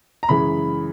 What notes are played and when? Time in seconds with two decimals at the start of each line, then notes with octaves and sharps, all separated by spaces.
0.23 A#5
0.29 F#2 C#3 E3 G#3 B5